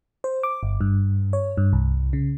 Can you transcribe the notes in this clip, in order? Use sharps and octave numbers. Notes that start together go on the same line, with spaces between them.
C5
D6
G1
G2
C#5
G2
C2
C#3